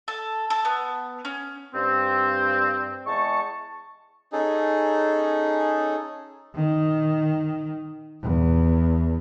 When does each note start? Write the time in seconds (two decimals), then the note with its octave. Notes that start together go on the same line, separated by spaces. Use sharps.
0.08 A4
0.50 A4
0.65 B3
1.25 C#4
1.73 G2 C4
3.06 E2 G#3 A5 C#6
4.32 C#4 D#4 G#4 A4
6.55 D#3
8.22 E2